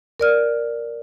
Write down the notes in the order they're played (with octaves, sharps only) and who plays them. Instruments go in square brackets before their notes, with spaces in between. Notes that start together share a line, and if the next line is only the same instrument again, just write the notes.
[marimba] A#4 D5 F6